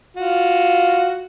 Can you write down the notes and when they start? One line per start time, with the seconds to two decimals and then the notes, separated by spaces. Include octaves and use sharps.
0.17 F4 F#4